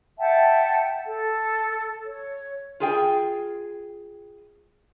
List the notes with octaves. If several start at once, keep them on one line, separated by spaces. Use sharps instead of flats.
E5 F#5 G5 A5
A4
C#5
F4 G#4 G5